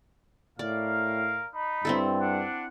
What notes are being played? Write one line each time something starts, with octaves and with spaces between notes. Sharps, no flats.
A2 A#4 D5 F5
D#4 B5
G2 C4 E4 A4
D4 F#5